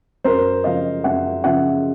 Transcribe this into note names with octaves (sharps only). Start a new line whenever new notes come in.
F#2 A#4 C5
C#3 F3 D#5 F5
F#2 E5 F#5
C#3 F3 E5 F#5